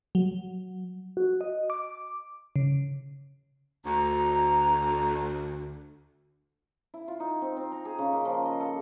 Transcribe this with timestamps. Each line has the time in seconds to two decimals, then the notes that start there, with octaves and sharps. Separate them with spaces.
0.15 F#3
1.17 F#4
1.41 D#5
1.70 D6
2.56 C#3
3.86 D2 A#5
6.94 E4
7.08 F4
7.20 D#4
7.42 C4
7.57 C4
7.72 A#5
7.85 G#4
7.98 C#3
8.13 A#3
8.25 F3
8.45 D#5
8.60 A4